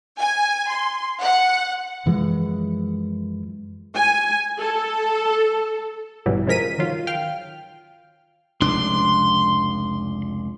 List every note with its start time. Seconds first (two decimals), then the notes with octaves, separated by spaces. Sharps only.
0.18 G#5
0.71 C6
1.21 F#5
2.06 F#2 E3 F3 G#3
3.96 G#5
4.58 A4
6.26 A1 G2 B2 E3 F#3 G3
6.47 C#3 F3 G#3 A#4 B6 D#7
6.78 D#3 F#3 F4
7.07 F5 G5 F6
8.61 F1 C#2 D4 C6